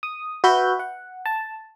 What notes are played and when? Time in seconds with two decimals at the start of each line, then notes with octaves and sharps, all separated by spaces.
0.03 D#6
0.44 F#4 B4 E5 G6
0.79 F#5
1.26 A5